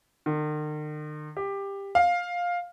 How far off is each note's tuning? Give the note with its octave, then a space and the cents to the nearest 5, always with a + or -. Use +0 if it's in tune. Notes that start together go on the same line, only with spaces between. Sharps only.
D#3 -45
G4 +15
F5 +10